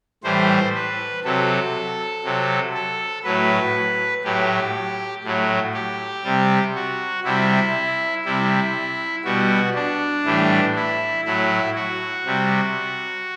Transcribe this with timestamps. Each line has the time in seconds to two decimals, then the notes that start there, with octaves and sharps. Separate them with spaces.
0.24 A2 E3 G3 C5
0.75 B4
1.24 C3 F#3 A4
2.24 C3 F#3
2.74 A4
3.24 A2 F#3 B4
4.24 A2 F#3 G4
5.24 A2 F#3
5.74 G4
6.24 C3 G3
6.75 F#4
7.24 C3 G3 E4
8.25 C3 G3 E4
9.24 B2 G3 F#4
9.75 D4
10.25 A2 E3 G3
10.76 E4
11.25 A2 F#3 E4
11.75 F#4
12.26 C3 G3